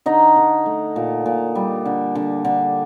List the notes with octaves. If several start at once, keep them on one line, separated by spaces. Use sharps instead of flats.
D3 D#4 D#5
D3
A3
A#2
A#2
G3
D3
D3
D3